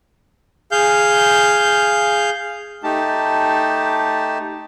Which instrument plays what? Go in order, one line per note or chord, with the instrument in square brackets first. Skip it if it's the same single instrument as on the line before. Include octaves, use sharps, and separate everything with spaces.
[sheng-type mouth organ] G#4 F5 G6
[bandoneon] A3 D#4 G4 A5